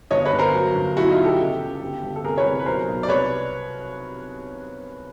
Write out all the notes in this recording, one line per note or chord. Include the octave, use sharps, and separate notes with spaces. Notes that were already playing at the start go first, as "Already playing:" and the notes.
G1 C#5 D#5
B4 C#5
G1
A#4 C5
F#3
G1
B1 E4 F#4
D#4 F4
B1
G4 A4
C#2
C#2
G1
G1
A4
C2 G#4 A#4
B4 C#5
C2
B4
B1 A#4 C5
B1
D5
C2 B4 C#5